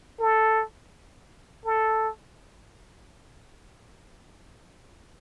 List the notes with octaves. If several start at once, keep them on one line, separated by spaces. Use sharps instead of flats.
A4
A4